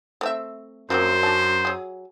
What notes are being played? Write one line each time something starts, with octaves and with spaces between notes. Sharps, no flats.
A3 C4 E5
F#2 F3 A#3 C4 C5
D4 A5
F#3 G#4